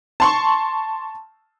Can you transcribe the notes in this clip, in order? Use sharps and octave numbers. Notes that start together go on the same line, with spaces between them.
A5 C6 C#6